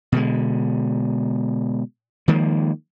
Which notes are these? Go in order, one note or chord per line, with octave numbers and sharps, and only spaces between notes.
B2 D3 G#3
D#3 F3 G#3 A#3